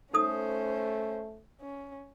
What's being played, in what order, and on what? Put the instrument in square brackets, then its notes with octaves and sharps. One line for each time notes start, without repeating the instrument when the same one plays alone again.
[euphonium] A3 [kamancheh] C#4 C5 [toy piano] D#4 A4 D#6
[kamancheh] C#4